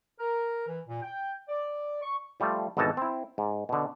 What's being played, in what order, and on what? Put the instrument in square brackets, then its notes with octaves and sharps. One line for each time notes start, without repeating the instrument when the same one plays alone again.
[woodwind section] A#4
E3
A#2
G5
D5
C#6
[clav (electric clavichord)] F3 G3 A3 F4
G#1 B2 E3 A4 D#5 A5
C4 E4
G#2
B2 D3